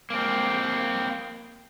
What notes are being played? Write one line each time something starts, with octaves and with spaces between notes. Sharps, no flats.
A#3 C4